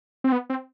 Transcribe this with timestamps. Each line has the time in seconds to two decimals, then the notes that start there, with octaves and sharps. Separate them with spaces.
0.24 C4
0.32 B3
0.50 C4